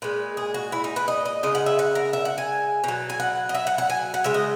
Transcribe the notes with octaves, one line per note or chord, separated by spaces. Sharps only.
A#2 G#3 B4
G#4
F#4
E4
D#4
B4
D#5
D#5
C#3 G#3 D#5
F#5
E5
F#5
A#4
E5
F#5
G#5
B2 F#3
G#5
F#5
D#5
E5
F#5
F#5
G#5
F#5
C#3 G#3 E5
D#5